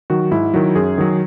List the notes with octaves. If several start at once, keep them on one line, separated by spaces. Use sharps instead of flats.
D#3 F#3 F#4
G#2 E4
D#3 F#3
F#2 G#4
D#3 F#3